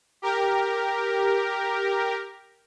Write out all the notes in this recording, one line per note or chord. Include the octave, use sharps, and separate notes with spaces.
G4 A#4